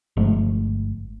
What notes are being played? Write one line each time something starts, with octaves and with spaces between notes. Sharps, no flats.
G1 F3 G#3 A3